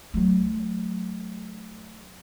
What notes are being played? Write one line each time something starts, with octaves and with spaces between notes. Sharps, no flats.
F#3 A3